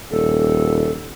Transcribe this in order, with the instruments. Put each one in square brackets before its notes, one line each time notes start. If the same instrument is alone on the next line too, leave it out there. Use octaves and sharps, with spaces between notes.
[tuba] D#1 [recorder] A4